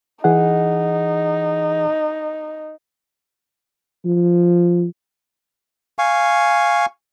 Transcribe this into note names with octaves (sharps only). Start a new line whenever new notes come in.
E3 D#4 G#4 F#5
F3
F5 G#5 C#6